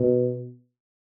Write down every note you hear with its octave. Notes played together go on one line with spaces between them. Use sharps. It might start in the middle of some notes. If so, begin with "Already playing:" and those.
Already playing: B2